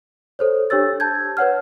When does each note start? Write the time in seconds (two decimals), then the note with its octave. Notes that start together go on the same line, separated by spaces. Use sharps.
0.39 A4 C5 C#5
0.70 D4 G4 C#5 E6 A6
1.00 A5 G6 G#6
1.37 B4 C#5 F#5 F6